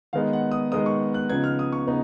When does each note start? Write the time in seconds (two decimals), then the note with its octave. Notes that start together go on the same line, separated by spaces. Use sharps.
0.13 D#3 G#3 B3 D#4 F5
0.33 F#5
0.51 D#6
0.72 D#3 G#3 B3 D#4 D#6
0.86 C#6
1.14 F#6
1.29 C#3 F3 B3 D#4 G#6
1.44 F6
1.59 D#6
1.72 C#6
1.87 C#3 B3 D#4